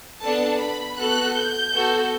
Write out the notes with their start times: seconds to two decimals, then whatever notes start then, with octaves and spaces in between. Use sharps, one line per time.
0.21 B3 D4 A4 A5
0.59 B5
0.97 B3 F#4 A4 F#6
1.36 G6
1.74 B3 F#4 A4